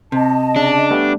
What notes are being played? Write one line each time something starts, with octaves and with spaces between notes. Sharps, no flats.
C3 D#5 A5
C#3 D4
G3 A3 B3